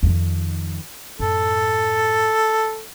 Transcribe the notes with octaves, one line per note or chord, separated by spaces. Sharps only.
F2 D#3
F#2 A2 A4